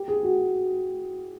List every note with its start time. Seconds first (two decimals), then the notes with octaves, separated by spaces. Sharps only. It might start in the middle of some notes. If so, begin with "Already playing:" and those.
Already playing: G4
0.08 G#4
0.23 F#4